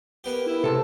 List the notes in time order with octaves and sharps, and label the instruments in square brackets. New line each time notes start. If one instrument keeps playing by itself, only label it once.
[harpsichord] A#3 B3 G4
[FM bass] E4
[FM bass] C3 [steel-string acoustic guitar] A4 A5